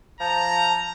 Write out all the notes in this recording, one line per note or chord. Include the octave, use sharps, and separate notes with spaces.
F3 A5 A#5